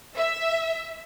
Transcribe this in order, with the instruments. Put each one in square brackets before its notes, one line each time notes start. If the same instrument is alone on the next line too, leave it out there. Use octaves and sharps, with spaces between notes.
[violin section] E5